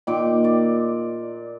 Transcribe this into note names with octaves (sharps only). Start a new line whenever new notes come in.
A#2 D#3 D6
D5